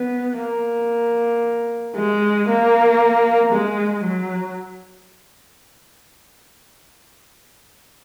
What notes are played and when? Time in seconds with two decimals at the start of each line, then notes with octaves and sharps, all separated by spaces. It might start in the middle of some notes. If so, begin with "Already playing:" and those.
Already playing: B3
0.40 A#3
1.96 G#3
2.48 A#3
3.52 G#3
4.04 F#3